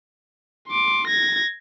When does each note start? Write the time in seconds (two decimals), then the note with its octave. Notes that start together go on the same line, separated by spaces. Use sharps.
0.68 C6 D6
1.07 G#6 A#6